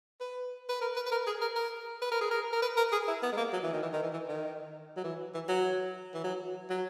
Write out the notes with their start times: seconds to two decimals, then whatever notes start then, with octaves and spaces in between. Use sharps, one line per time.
0.21 B4
0.69 B4
0.81 A#4
0.96 B4
1.06 B4
1.12 A#4
1.27 G#4
1.42 A#4
1.56 A#4
2.02 B4
2.12 A#4
2.21 G#4
2.31 A#4
2.53 A#4
2.62 B4
2.77 A#4
2.92 G#4
3.08 E4
3.23 B3
3.32 G#3
3.37 A#3
3.53 F#3
3.63 E3
3.73 D#3
3.83 E3
3.93 D#3
4.03 E3
4.13 E3
4.29 D#3
4.97 F#3
5.04 E3
5.34 E3
5.49 F#3
6.14 E3
6.24 F#3
6.70 F#3